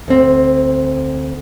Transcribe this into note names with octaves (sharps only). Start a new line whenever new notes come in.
D2 C4